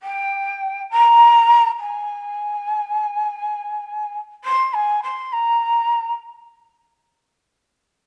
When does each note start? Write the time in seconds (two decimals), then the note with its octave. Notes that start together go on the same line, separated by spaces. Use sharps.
0.03 G5
0.91 A#5
1.80 G#5
4.44 C6
4.74 G#5
5.03 C6
5.32 A#5